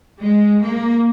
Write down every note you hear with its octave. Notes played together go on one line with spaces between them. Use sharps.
G#3
A#3